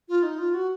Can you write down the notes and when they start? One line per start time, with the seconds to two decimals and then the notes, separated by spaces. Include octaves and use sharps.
0.09 F4
0.23 D#4
0.39 F4
0.54 F#4